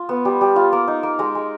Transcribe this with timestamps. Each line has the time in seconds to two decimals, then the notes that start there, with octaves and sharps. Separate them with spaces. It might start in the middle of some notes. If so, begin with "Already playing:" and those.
Already playing: F4
0.09 B3
0.25 G3
0.41 G3
0.56 F4
0.73 A#3
0.88 D#4
1.03 A#3
1.19 G#3 A#5
1.35 G#3